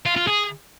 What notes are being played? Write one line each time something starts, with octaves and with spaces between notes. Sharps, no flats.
F4
F4
G#4